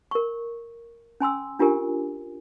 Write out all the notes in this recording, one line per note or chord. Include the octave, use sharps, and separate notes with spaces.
A#4 C#6
C#4 G#5 C6 E6
D4 F4 G4 A#4 G#5